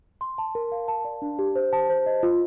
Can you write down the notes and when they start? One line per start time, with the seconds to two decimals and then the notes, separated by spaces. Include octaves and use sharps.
0.21 C6
0.38 A5
0.55 A#4
0.72 F5
0.88 A5
1.05 D5
1.22 D4
1.39 G4
1.56 C5
1.73 A5
1.90 C5
2.06 D#5
2.23 F4